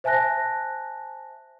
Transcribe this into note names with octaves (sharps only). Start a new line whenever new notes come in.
C5 E5 G#5 A5 F#6 A#6